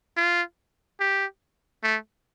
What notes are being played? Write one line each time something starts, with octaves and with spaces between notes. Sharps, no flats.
F4
G4
A3